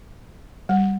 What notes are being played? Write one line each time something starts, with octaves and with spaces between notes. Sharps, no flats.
G3